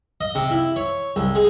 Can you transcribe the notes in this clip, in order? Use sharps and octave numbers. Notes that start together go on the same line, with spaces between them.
D#5
C3
E4
C#5
C2
G#3